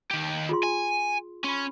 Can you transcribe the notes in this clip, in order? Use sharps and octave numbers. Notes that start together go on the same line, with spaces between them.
D#3 G4
F4 G#4 C6
G#5
C#4 B5 C6